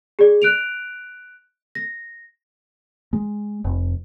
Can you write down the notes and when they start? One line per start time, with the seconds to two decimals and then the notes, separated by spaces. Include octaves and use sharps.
0.19 G#4 D5
0.42 F#6 D7 F7
1.75 A#6
3.13 G#3
3.64 F1